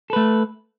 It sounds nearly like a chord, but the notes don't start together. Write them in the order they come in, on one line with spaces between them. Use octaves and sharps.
A4 B4 A3